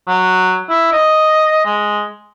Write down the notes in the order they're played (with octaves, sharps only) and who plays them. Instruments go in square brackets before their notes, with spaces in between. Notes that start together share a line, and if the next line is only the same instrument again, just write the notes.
[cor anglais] F#3
E4
D#5
G#3